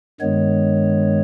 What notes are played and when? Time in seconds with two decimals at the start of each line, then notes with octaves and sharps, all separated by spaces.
0.20 G2 D#3 G#3 B3 C#5